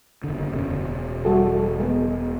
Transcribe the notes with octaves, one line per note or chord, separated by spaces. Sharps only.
F#1 D3
E1 B2 C#4
G3 F#4 A4
G#3 B3